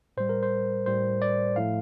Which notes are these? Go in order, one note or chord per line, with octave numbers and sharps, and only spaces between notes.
A2 G3 C5
A#4
C5
A2 G3 C5
D5
A2 F3 A3 F5